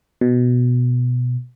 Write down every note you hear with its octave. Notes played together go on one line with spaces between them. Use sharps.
B2